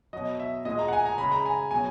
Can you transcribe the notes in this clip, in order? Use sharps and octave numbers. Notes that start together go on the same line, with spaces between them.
B2 F#3 D#5
E5
A#2 G#3 D#5
A#5
F#5
G#5
A#5
C#3 G#3 B5
A#5
G#5
B2 F#3 G#5